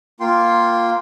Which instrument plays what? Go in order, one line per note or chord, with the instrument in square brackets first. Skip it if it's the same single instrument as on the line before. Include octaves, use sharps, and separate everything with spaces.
[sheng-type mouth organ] A#3 F4 G5 C6